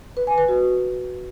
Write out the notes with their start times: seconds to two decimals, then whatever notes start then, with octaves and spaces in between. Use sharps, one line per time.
0.17 B4
0.27 G#5
0.38 B4
0.48 F#4